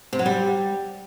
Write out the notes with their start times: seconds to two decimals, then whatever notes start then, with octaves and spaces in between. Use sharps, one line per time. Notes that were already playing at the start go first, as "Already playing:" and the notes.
0.13 C3
0.19 F#3
0.26 G3